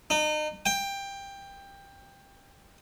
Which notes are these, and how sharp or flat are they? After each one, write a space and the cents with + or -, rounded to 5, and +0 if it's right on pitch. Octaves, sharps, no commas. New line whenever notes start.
D#4 -35
G5 +15